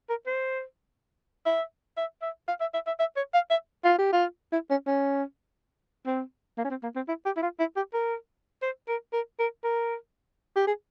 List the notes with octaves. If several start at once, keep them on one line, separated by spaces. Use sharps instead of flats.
A#4
C5
E5
E5
E5
F5
E5
E5
E5
E5
C#5
F5
E5
F4
G4
F4
E4
C#4
C#4
C4
A#3
C#4
C4
A#3
C4
E4
G4
E4
F4
E4
G4
A#4
C5
A#4
A#4
A#4
A#4
G4
G#4